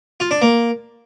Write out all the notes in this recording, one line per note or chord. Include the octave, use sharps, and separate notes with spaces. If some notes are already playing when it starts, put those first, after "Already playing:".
F4
D4
A#3